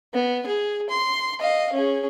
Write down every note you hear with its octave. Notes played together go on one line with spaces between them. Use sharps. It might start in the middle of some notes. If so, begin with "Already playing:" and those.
B3
G#4
C6
D#5 F5
C#4 G#4